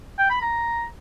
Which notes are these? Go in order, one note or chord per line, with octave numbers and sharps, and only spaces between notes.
G5
B5
A#5